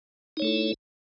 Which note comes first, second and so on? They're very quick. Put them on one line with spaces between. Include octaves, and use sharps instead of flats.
D#4 C#5 A3 A4 E4